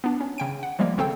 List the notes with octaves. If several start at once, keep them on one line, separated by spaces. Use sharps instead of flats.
B3 D4
C#4
C#3 G5 D7
F#5
F3 G3 G#3 A#3
G#1 C#3 C4 A4 G5